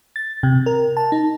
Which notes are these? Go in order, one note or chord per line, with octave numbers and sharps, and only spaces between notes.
A6
C3
A#4
A5
D#4